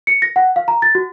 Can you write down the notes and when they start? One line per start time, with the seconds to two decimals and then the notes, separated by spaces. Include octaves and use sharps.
0.07 C#7
0.22 A#6
0.36 F#5
0.56 F5
0.68 A#5
0.82 A6
0.95 F#4